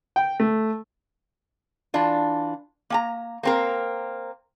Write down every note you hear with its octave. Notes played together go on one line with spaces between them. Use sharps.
G5
A3
E3 D4 F4
A#3 G#5 A#5
A#3 C4 A#4